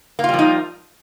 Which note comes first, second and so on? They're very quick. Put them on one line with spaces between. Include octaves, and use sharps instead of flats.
A#3 F4 G3 F3 D#4